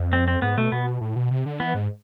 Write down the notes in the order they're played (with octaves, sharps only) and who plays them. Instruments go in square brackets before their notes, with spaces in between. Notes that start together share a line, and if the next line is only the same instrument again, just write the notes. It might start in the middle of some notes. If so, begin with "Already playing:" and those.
Already playing: [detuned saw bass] F2
[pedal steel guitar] C4
C4
[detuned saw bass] G#2 [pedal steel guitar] B3
[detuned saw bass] B2 [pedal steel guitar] A3
[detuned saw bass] B2 [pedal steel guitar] B3
[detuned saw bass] A2
B2
C3
D3
[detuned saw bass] E3 [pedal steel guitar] B3
[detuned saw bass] G#2